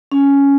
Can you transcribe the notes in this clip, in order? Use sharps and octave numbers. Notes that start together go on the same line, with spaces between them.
C#4